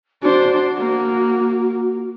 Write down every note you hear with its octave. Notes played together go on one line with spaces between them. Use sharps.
D4 F#4 C5
A#3